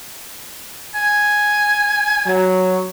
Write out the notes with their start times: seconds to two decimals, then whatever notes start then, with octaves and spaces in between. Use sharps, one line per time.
0.95 G#5
2.26 F#3